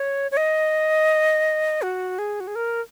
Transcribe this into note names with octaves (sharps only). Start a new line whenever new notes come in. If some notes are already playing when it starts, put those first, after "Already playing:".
Already playing: C#5
C#5
D#5
F#4
G#4
F#4
G#4
A#4